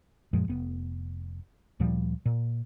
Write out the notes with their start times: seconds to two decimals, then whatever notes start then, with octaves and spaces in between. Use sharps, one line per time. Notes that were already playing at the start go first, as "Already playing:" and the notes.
0.33 F#2 A#2 F3 G#3
0.48 F1 B3
1.80 D2 A#2 F3 G3
2.26 A#2